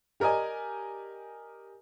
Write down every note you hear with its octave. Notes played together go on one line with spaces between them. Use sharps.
G4 A#4 D5 D#5 G#5